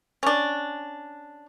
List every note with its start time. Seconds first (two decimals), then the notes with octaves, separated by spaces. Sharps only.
0.23 C#4 D4